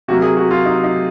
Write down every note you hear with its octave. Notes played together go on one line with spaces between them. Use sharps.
C3 F#3 A#3 F#4
G#4
F#4
F4
D#4
D#4